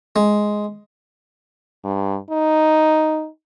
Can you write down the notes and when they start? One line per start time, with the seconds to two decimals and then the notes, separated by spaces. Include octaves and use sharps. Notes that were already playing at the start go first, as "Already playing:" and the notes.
0.16 G#3
1.85 G2
2.31 D#4